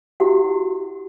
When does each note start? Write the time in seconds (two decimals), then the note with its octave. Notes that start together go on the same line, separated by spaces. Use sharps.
0.20 E4 F#4 G4 F#5